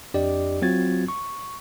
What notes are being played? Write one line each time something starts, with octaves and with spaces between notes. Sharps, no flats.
F2 D4 G4 D5 D#5
F#3 C4 F4 F#4 G#6 A6
C#6